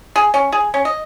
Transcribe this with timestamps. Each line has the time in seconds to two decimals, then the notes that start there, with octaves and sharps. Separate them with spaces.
0.16 G#4
0.34 C#4
0.52 G#4
0.74 C#4
0.85 D#5